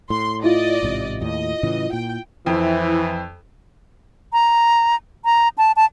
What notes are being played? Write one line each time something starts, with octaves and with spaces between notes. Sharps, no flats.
A2 C6
E4 F4 D5 D#5
A1 G#2 C3
D#2 A2 D#5
A2 C#3 E3
A#2 G5
F2 E3 C4 E4
A#5
A#5
A5
A5